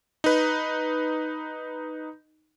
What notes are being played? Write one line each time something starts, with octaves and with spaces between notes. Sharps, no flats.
D#4 B4